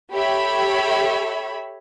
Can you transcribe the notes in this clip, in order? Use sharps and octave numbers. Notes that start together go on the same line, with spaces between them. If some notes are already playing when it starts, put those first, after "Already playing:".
G4 A4 C#5 E5 B5